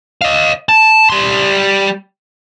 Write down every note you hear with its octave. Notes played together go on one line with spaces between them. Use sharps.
D#5 F5
A5
G3 C6